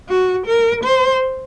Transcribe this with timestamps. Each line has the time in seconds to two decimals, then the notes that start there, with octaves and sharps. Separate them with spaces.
0.09 F#4
0.46 A#4
0.84 C5